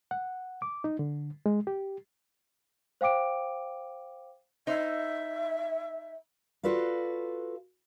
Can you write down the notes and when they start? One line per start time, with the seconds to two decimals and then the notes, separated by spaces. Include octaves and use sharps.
0.11 F#5
0.62 D6
0.84 D#4
0.99 D3
1.46 G#3
1.67 G4
3.01 C5 F5 G5 D6 D7
4.67 D#4 C5 E5
6.63 F4 F#4 A4 B4 D5 F5